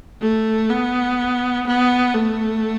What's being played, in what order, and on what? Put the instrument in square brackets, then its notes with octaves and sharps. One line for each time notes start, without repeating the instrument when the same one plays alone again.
[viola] A3
B3
B3
A3